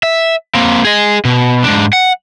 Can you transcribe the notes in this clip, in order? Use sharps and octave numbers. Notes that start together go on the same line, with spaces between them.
E5
A#3 C4
G#4 D#5
B2
G#2 D4
F#5